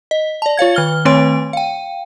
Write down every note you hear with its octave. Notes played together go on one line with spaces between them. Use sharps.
D#5
D5 A5
F4 C#5 F5 G#6
D#3 F6 G7
D#3 A3 C4 C#5 C6 D7
F5 G5